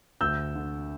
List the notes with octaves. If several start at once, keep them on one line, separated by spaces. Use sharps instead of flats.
D2 E6 G6
D3